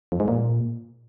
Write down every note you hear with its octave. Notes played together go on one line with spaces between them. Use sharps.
F2
G#2
A#2